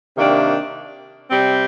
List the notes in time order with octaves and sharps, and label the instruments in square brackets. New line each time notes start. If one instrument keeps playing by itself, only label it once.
[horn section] C3 D#3 A#3 D4
C3 G3 C4